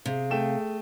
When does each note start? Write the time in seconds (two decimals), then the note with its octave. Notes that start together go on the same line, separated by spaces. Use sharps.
0.06 C3 G#4 F5
0.30 A3 G5 E7